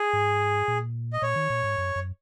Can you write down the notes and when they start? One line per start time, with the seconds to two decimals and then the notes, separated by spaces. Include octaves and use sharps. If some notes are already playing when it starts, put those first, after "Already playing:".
Already playing: G#4
0.13 G#2
0.68 A#2
1.13 D#5
1.22 A#2 C#5
1.36 D#3
1.50 A#2
1.64 G#2
1.78 F#2
1.96 F#2